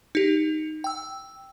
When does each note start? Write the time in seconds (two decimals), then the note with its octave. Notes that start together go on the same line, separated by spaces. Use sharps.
0.15 D#4 G4
0.84 G5 E6